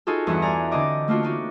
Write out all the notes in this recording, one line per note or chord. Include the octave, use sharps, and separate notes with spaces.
D#4 F4 F#4 G#4 A4
E2 G2 E4 F#5
D5 G#5 A#5
D3 C4 D4 D#5 D6
A3 A#3 D4 F4 F#4
D4 D#4 F#4